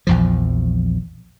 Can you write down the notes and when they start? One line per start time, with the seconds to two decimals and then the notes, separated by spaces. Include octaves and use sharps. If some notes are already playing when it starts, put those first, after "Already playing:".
0.07 A#1 E2 F3